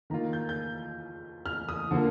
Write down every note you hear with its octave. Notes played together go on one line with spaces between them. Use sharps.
D#3 A#3 F4 A#5
G6
G6
F6
D#6
D3 F3 A#3